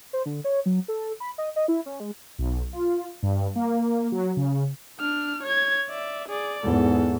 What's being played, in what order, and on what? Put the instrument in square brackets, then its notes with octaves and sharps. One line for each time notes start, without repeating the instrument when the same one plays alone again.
[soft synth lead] C5
D3
C#5
F#3
A4
B5
D#5
D#5
E4
C#4
G#3
[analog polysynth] B1
F4
G2
A#3
F#3
C#3
[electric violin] D4 F6
C#5 G#6
D5 E5
G#4 D5
[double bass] E2 G#2 [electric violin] A4